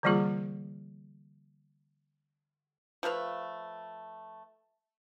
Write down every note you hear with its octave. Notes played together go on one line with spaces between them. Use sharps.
D3 E3 G3 A#3 F4 G#4
F3 A3 B4 F5